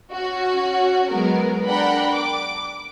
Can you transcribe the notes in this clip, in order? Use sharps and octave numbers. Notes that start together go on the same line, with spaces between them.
C#4 F#4
F#3 G#3 B3 A#4
D4 A#4 D5 F#5 G5 B5
D6